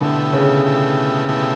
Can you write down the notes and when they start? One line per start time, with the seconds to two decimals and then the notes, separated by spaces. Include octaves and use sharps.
0.01 B2 D3 A3 E4 G4
0.33 C#3
0.64 B2 A3 E4 G4
1.29 B2 A3 E4 G4